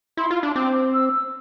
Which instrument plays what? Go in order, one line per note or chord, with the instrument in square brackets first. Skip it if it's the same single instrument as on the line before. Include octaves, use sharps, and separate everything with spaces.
[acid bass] E4 [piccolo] C6
[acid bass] F4
D4
[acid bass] C4 [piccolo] D6
[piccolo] E6